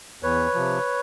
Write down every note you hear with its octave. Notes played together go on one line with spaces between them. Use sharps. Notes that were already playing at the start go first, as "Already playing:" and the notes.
E2 B4 C#5
C3 F3